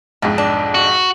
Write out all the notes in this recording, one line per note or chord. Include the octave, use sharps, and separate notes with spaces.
B1 F2 G#2 D3
D4
F#4